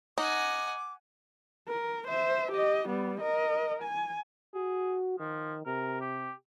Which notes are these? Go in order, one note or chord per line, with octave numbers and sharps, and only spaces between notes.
D#4 F#5 G#5 D6
A#4
C5 E5
G4 D#5
G3 B3
A#4 D#5
G#5
F#4 G#4
D#3 F3
C3 A#4
G4